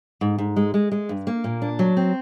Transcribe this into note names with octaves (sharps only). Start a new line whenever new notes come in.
G#2
G#2
G#3
G#3
G#3
G2
A#3
A#2
D4
F#3
C4